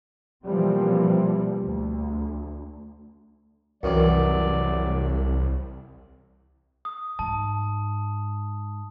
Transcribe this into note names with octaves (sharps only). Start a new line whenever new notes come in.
B2 E3 F3 G3 A#3 C4
D2
C2 F#2 D#3 E3 F#3 D5
D#6
G#2 A5